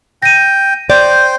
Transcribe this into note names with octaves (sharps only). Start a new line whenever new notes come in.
G5 A#6 D#7
C5 D5 G5